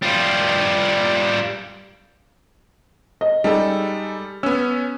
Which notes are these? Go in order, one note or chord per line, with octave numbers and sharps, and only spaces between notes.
G3 F4
D#5
G3 G#3 D#4 A4
B3 C#4 E6